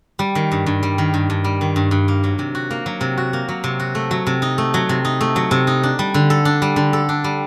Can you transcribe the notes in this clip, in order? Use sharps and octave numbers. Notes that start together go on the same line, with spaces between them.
G3
D#3
G2
G2
G3
D#3
G2
G2
G3
D#3
G2
G2
A#3
F#3
C3
F#4
A#3
F#3
C3
F#4
A#3
F#3
C3
F#4
A3
F#3
C3
D#4
A3
F#3
C3
D#4
A3
F#3
C3
D#4
D4
G3
D3
A4
D4
G3
D3
A4
D4
G3